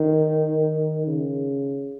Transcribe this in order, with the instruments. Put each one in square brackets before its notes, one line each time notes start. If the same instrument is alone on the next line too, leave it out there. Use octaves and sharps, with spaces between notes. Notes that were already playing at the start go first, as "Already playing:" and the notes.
Already playing: [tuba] D#3
C#3